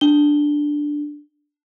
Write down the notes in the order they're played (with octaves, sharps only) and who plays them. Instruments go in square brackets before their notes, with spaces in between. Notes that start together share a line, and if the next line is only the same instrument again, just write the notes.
[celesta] D4 G7